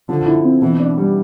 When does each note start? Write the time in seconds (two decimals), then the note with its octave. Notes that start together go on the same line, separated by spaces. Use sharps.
0.09 D3 F3
0.26 E4
0.44 C4
0.62 B2 E3
0.80 D4
0.98 G3